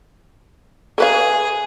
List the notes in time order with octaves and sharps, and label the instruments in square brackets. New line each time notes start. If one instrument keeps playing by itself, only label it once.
[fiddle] G#4 [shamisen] A4 B4 F5